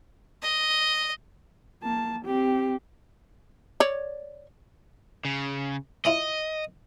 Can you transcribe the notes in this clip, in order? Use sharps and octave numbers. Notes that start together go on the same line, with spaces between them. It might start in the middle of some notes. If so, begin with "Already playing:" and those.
D#5
A#3 A5
C4 G4
C#5 D5
C#3
C#4 E4 F4 D#5